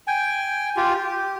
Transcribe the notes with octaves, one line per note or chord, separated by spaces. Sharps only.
G5 G#5
F4 G4
G4